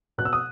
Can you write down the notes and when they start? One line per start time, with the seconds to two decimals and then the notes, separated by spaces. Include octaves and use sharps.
0.18 B2 F#6
0.25 E6
0.33 D#6